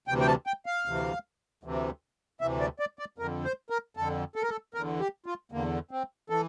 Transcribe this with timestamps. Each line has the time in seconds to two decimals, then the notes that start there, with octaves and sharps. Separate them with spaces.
0.08 D2 C3 E3 G5
0.20 G5
0.27 A5
0.47 G5
0.66 F5
0.85 D2 C3 E3
1.63 D2 C3 E3
2.41 D2 C3 E3 E5
2.60 D5
2.79 D5
2.99 D5
3.18 F2 A#4
3.22 D3
3.45 C5
3.70 A#4
3.97 F2 D3 A4
4.36 A4
4.43 A#4
4.49 A4
4.74 E2 D3 A#4
5.00 G4
5.26 F4
5.52 E2 D3 A#3
5.91 C4
6.30 E3 A4